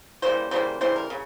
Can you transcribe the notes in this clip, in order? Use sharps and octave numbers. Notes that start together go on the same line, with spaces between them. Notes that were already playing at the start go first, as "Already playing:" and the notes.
C#3 E3 G3 A#3 C5
C#3 E3 G3 A#3 C5
C#3 E3 G3 C5
A#4
C#3